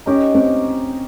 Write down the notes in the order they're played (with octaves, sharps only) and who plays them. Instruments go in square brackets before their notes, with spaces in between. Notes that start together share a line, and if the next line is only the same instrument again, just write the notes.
[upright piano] C#4 [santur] D#4 G4 A#4 C#5
[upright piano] C4